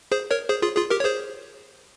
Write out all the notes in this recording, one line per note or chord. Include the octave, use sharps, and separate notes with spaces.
G#4 C5
A#4 C#5
G#4 C5
F4 G#4
F4 G#4
G4 A#4
C#5
G#4 C5